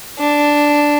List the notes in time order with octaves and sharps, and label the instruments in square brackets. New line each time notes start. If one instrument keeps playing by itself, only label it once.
[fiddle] D4